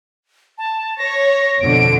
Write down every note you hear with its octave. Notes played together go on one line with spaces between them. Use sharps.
A5
C#5 A#6
F2 B2 D3 D7